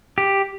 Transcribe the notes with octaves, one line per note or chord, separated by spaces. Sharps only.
G4